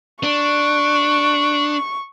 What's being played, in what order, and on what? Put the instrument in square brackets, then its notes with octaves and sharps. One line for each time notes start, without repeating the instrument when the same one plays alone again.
[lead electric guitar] D4 [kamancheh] C#6